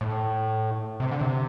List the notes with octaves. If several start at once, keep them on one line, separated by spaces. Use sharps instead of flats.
A2
C3
D3
C3